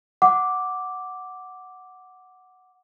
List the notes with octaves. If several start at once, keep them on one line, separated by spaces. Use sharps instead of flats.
F#5 D6